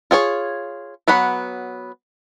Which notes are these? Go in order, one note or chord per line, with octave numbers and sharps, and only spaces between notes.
F4 G#4 C#5
F#3 B3 F#5 B5